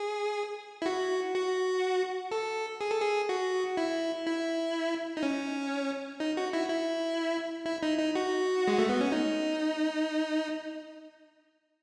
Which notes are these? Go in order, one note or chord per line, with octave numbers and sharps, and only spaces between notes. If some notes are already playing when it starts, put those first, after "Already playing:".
Already playing: G#4
E4
F#4
F#4
A4
G#4
A4
G#4
F#4
E4
E4
D#4
C#4
D#4
F#4
E4
E4
E4
D#4
D#4
F#4
G#3
A3
B3
C#4
D#4